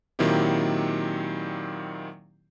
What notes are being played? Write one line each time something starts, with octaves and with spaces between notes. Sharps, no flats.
A#2 D#3 F#3 C4 E4 G4